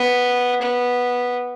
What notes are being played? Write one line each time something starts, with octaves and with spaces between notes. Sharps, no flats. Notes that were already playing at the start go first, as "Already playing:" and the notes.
Already playing: B3
B3